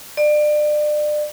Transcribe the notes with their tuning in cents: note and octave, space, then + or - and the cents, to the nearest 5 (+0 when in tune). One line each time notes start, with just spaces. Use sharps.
D5 +30